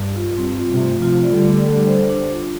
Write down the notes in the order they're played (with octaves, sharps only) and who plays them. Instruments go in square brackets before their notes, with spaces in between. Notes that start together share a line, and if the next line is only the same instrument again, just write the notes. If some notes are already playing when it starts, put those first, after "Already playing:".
Already playing: [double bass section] G2
[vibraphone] F4
[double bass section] G2 [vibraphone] C4
[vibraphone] F4
[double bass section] G2 C3
[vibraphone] A3
[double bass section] C3 F3 [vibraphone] F4
[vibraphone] D5
[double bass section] D3 G3
[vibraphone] A3
A4
C5
D4
F4